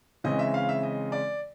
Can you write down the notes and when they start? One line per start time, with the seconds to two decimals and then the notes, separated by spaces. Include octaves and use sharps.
0.24 C#3 E3 G#3 C4 D#5
0.39 E5
0.54 F5
0.69 E5
0.83 D#5
1.12 D5